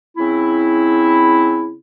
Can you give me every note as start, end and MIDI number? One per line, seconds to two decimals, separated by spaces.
0.17 1.74 49
0.17 1.74 60
0.17 1.74 64